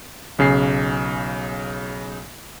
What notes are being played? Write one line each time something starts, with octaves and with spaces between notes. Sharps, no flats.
B1 C#3 G#5 C7